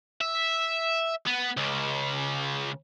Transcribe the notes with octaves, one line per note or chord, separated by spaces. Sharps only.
E5
B3
C#2 C#3